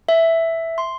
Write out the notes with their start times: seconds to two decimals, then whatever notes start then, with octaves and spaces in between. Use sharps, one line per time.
0.09 E5
0.78 C6